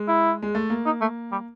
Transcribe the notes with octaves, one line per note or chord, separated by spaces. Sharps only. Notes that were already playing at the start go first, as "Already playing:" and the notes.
Already playing: G#3
E4
G#3
A3
A#3
D#4
A3
G3